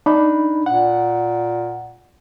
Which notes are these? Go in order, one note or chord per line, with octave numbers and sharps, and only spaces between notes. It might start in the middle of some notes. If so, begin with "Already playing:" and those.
D4 D#4 B5
A#2 F#5